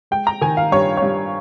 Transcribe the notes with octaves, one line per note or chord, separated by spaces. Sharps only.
G#3 G5
A#5
D#3 G#5
F5
G2 C#5
G2 C#5